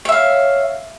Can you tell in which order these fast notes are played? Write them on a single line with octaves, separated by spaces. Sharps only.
C#5 E5 F5